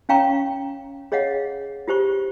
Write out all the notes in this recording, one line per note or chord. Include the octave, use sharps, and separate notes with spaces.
C#4 C#5 F5 G5 A#5 C#6
G#4 C#5 D#5 F5 F#5
F4 G4 C5 C#6